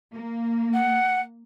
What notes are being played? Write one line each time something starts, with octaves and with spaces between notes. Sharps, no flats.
A#3
F#5